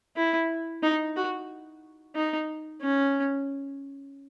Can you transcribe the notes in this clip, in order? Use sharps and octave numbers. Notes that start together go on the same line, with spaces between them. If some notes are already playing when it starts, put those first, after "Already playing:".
E4
D#4
F#4
D#4
C#4